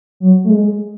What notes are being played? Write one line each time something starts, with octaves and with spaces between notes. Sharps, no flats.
F#3
A3
G#3